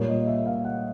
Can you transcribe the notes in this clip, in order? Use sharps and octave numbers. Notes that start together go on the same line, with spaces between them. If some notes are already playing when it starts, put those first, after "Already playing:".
Already playing: A#2 G3 A#3 C#5
D#5
E5
F5
F#5